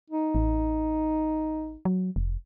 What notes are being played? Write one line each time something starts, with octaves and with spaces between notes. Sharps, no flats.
D#4
A1
F#3
F1